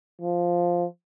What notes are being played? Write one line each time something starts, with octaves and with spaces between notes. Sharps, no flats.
F3